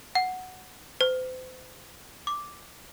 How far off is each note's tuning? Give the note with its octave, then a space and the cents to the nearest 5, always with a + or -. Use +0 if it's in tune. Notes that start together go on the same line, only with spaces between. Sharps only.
F#5 -5
C5 -35
D6 -5